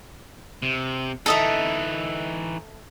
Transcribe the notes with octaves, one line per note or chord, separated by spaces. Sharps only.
C3
E3 D#4 A4 D#5 E5